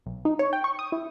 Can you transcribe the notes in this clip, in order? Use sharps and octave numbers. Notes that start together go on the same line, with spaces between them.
B1
D#4
C#5
G5
C#6
D#6
E4